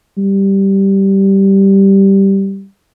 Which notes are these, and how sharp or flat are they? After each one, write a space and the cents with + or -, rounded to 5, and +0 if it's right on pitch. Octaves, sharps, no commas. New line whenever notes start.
G3 -5